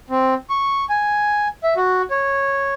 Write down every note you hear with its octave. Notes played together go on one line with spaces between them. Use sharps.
C4
C#6
G#5
E5
F#4
C#5